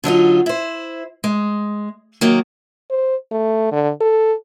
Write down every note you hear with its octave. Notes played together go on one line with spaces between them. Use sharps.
D3 F#3 D#4 F4
E4 C5
G#3
D#3 F#3 A#3
C5
A3
D3
A4